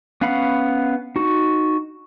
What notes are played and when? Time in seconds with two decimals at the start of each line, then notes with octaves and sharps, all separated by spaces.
0.21 B3 C#4 F5 F#5 B5
1.16 D#4 F#4